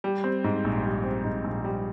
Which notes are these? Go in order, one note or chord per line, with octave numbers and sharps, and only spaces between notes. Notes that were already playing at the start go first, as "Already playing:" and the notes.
G3
C4
G#2
A#1
G3
C4
G#2
A#1
G3